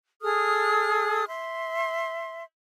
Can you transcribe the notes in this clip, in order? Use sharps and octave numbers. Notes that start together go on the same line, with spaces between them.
G#4 A4 D#6 F6
E5 C6